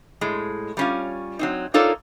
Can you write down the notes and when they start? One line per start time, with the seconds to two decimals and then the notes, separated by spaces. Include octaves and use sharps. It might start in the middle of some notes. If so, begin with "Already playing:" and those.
0.21 A2 G#3
0.77 G3 C#4 F4
1.39 F#3 C4 D#4
1.74 D#4 F4 A4 A#4 C#5 D5